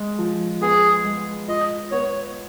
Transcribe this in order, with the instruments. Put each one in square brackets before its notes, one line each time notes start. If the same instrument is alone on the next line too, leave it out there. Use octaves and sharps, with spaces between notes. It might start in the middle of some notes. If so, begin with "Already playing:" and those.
Already playing: [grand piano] G#3
F3
[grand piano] B3 [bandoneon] G#4
[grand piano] G#3
[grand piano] F4 [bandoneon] D#5
[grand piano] B3 [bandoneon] C#5